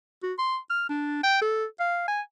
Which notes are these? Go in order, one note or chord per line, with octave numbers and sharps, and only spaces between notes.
F#4
C6
F6
D4
G5
A4
F5
G#5